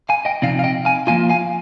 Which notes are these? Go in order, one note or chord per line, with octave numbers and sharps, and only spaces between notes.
F5 G#5
D#5 G5
C3 F3 C4 D#4 D5 F5
F5
D#5 G5
F5 G#5
F3 A#3 F4 F5 G#5
F5 G#5